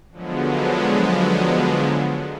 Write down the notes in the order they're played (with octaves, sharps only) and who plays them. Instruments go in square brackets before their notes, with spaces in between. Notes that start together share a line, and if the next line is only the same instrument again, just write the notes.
[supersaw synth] D3 F3 F#3 G#3 B3